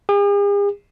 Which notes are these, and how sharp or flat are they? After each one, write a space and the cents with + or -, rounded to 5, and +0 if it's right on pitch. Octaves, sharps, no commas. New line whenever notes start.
G#4 -45